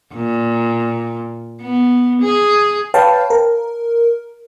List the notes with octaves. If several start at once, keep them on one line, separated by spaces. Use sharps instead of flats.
A#2
B3
G#4
B4 C#5 F5 G5 A5
A#4